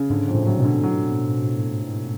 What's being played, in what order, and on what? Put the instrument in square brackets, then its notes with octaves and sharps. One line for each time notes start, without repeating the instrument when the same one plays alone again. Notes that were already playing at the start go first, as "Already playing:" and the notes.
Already playing: [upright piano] C#3
[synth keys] G#2 [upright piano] D3
[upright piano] F2
[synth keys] A2
[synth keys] A2 [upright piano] F#3
[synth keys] B2
[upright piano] D3
F#3